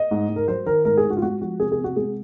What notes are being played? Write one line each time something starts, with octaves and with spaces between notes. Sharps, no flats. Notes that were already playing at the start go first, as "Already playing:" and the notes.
Already playing: D#5
G#2
G#2
A#4
F#3 C5
D#3 A#4
G#2 A#4
G#4
G#2
F#4
F4
G#3 F#4
F3 F#4
C3 G#4
G#4
C3
F#4
G#3 G#4